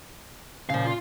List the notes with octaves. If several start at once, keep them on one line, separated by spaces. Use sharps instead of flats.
A#2 C#3 C5 F5
F4